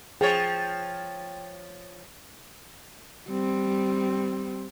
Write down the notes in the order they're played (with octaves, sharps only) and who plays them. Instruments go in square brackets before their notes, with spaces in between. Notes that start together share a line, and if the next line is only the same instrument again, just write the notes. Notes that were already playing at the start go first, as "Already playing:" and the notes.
[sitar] F3 C#5 [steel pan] G#4 [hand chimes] G5 A6
[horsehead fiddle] G3 C4